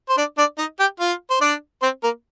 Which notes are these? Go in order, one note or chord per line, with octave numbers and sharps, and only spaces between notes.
C5
D4 D5
D4 D5
D#4 D#5
G4 G5
F4 F5
C5
D4 D5
C4 C5
A#3 A#4